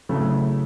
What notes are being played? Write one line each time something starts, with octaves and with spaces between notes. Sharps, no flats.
C#3 F#3 A3 E4